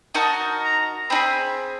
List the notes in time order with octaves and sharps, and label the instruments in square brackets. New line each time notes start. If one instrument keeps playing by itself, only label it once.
[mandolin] D#4 F#4 A#4 D#5 [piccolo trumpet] A5
[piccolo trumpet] A#5
[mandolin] C4 D#4 [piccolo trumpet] B5
[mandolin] G#4